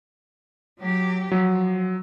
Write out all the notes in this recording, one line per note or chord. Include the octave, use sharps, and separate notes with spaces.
F#3 G4
F3 F#3